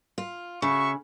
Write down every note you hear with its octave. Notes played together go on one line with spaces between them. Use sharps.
F4
C#3 F#4 E5 C#6